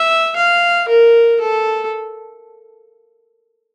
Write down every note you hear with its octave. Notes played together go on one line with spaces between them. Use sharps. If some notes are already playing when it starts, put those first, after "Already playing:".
Already playing: E5
F5
A#4
A4